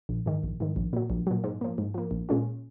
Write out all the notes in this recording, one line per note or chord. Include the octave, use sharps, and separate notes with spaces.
A#1
G#2 D#3
A#1
G#2 D#3
A#1
A#2 F#3
A#1
A#2 F#3
G#2
F3 A#3
G#2
F3 A#3
A#1
A#2 G#3 C#4 F4